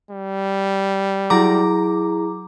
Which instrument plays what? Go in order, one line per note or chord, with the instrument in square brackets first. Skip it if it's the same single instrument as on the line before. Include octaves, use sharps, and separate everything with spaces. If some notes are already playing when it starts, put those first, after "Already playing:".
[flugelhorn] G3
[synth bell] F#3 A#5 D6 [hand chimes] E4 G#4